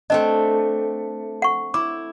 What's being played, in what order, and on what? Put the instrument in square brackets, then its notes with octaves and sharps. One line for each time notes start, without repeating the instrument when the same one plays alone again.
[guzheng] A3 C4 D4 [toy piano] D#5
[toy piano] F#5 C#6
[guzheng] E4 [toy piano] D6